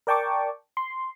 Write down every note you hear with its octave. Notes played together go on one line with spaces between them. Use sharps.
A#4 D5 G5 A5 C#6 D6
C6